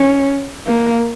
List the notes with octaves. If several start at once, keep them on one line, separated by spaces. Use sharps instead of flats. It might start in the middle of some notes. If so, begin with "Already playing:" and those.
Already playing: C#4
A#3